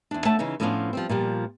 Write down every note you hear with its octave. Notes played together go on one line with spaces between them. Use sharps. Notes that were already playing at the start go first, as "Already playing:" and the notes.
E2 D4
A3 C#5 F#5 A5
C#3 E3 C#4 D#4
A2 F3 B3 C#4 D4 F4
F3 G3 C4
A#2 F3 G3